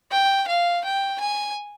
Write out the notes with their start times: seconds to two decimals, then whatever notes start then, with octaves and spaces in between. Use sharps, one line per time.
0.11 G5
0.48 F5
0.84 G5
1.20 G#5